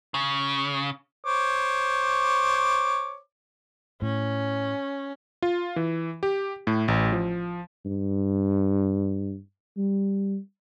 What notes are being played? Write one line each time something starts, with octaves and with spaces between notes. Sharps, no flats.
C#3
C5 C#5 D6
A2 C#4
F4
E3
G4
A2
A1
F3
G2
G3